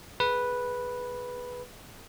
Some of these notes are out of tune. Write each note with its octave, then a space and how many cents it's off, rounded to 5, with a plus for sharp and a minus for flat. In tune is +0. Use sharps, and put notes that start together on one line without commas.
G#4 +15 B4 -5